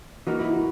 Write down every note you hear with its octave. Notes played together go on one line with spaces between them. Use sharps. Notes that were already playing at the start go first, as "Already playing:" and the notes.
E3 A#3 D#4 F#4
E4
F#4